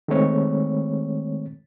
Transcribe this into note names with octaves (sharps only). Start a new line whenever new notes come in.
D#3 G#3 A3 C4 C#5